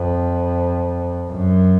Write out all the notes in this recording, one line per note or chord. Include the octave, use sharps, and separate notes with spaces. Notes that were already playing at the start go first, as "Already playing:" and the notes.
Already playing: F2
F#2